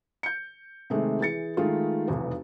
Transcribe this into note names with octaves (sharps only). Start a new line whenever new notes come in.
G6 C#7
C3 D#3 G#3 A3
E3 G#4 A6 C#7
D#3 G#3 A3 F4
F1 B1 E2 B3